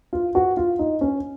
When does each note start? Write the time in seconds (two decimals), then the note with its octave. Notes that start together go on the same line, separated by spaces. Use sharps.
0.13 F4
0.35 F#4
0.57 F4
0.79 D#4
1.01 C#4